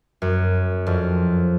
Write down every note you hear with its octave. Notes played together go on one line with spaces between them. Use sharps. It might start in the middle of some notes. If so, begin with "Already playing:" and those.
F#2
F2